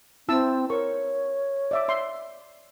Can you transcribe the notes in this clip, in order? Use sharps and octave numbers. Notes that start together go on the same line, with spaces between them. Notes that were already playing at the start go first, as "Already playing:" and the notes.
C4 E4 A5 E6
A#4 C#5 C#6
D5 E5 D6
E5 C6